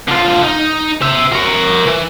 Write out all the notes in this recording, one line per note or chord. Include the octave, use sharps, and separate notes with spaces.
D3 F4
D#4
C5 E5
A#4 C#5
E3